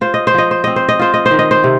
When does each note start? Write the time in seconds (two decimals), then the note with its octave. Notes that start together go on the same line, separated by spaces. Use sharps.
0.01 F4 C5
0.14 D#5
0.27 C5
0.34 F3 D#5
0.51 C5
0.64 C4 D#5
0.76 C5
0.89 D#5
0.99 F4 C5
1.14 D#5
1.26 C5
1.31 D#3
1.39 D#5
1.51 C5
1.64 C3